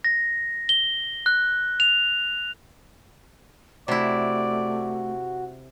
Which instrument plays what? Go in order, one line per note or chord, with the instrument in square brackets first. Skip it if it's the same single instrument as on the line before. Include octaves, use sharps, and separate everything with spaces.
[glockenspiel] A#6
G7
F#6
F7
[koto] C3 E4 [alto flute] A3 [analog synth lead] F#4 [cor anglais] D5